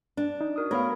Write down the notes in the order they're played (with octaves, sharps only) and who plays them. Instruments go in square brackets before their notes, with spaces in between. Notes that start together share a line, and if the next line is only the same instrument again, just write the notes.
[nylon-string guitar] D4
[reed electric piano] D#4
[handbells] F#4 A#4 D#6
[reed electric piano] A3 B3 F5 [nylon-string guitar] A#4 [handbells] C#5 B5 F6